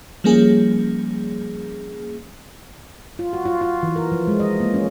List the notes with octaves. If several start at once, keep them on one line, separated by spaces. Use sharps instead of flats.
F3 G3 A#3 C#4 G#4
F4
F#4
F4
F4
E3
A#4
F3
G#3
D#5
A#3
C#4